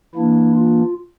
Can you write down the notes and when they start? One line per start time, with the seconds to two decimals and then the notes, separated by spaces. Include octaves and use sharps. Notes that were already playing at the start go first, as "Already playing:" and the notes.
0.15 E3 A#3 D4 E4
0.56 F4